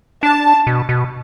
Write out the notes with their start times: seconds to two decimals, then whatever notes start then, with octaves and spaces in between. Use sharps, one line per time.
0.23 D4 A5
0.67 B2
0.89 B2